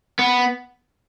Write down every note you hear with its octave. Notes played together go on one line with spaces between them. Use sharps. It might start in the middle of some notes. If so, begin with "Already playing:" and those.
B3